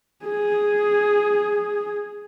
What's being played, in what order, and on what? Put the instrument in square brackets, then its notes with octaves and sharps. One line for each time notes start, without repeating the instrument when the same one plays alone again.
[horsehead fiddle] G#4